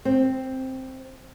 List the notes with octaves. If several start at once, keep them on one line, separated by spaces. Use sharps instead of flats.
C4